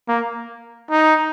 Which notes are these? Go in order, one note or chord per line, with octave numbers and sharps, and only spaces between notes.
A#3
D#4